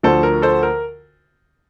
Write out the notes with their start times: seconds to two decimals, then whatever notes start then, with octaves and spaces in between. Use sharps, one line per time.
0.03 D2 D3 F3 A4 C5
0.23 A#4
0.42 A4 C5
0.63 A#4